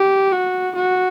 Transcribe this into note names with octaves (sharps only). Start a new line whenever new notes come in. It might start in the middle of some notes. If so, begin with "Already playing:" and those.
Already playing: G4
F#4
F#4